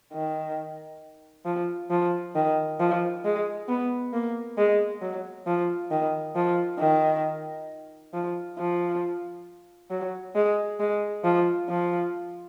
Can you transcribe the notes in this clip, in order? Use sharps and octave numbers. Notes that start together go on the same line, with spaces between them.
D#3
F3
F3
D#3
F3
G#3
B3
A#3
G#3
F#3
F3
D#3
F3
D#3
F3
F3
F#3
G#3
G#3
F3
F3